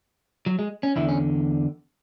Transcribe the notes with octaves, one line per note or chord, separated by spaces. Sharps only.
F#3
G#3
C#4
E2 D3 E4
C#4